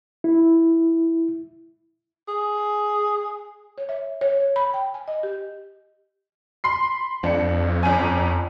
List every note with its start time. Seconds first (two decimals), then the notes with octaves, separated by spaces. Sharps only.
0.24 E4
2.28 G#4
3.78 C#5
3.89 E5
4.21 C#5
4.40 C#5
4.56 B5
4.74 G5
4.94 G#5
5.08 D#5
5.23 G4
6.64 B5 C6 C7
7.23 F2 D4 C#7
7.83 G1 C#4 G#5